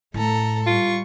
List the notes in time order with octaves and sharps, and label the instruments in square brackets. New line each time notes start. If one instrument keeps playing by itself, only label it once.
[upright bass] A2 [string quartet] A3 A4 A#5
[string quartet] G3 C#6 [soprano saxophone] F4